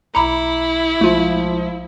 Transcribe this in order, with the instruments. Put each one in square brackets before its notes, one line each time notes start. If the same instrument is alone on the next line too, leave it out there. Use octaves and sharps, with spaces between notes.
[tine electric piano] B1 D6 C#7 [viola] E4 [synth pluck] A#5 B5
[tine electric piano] B1 G#3 [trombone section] F3 [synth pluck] A3 F4